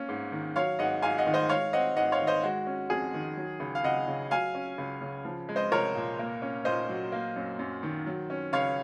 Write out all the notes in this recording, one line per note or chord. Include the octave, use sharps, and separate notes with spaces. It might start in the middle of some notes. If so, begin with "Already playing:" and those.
Already playing: A#3 C#4
G#2
D#3
F#3 C#5 F5
G#2 D#5 F#5
G#2 F5 G#5
D#5 F#5
D#3
C5 D#5
G#3 C#5 F5
C4 D#5 F#5
G#2 D#5 F#5
C#5 F5
D#3
C5 D#5
G#3 F#4
C#4
F2 G#4
D#3
F#3
C#2
F5
C#2 D#5 F#5
C#3
F#3 F5 G#5
C#4
C#2
C#3
F3
G#3
C5 D#5
C2 A#4 C#5
A#2
A#3
C#4
A#2 C5 D#5
F#3
A#3
F#2
F#2
D#3
F#3
C#4
C#2 C#5 F5